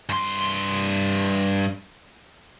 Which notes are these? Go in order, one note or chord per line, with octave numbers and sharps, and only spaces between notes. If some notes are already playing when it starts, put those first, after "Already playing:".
G2 C6